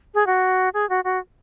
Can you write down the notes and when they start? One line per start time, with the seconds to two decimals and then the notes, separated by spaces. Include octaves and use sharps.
0.15 G#4
0.27 F#4
0.74 G#4
0.89 F#4
1.04 F#4